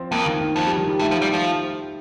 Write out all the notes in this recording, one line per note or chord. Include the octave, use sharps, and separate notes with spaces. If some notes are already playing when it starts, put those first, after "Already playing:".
Already playing: F3 C4
F2 A#3
D#3
D#3
F2 F3
G3
D#3
G3
G2 A3
F3
G3
F3